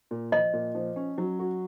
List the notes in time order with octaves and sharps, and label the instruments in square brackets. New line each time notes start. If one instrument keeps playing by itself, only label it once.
[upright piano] A#2
[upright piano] F3 [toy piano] D#5
[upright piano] A#2
F3
C#4
F#3
F#4